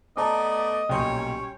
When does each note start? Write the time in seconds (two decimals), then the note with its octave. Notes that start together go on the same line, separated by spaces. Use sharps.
0.17 A3 B3 D5 D#5 A5 A#5 D6
0.89 B1 A#2 G3 C#4 C#5 G5 C6